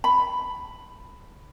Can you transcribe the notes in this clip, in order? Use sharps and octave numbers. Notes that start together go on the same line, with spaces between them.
B5